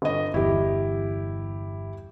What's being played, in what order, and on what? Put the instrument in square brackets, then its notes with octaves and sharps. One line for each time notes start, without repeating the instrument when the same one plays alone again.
[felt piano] G1 D#5
[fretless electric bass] G1 E2 [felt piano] E4 G4